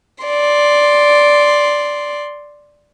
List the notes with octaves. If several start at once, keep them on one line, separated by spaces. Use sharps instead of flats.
D5 C6